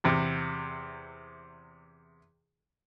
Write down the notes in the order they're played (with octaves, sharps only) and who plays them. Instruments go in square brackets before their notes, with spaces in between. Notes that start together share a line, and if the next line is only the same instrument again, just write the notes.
[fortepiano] E2 C3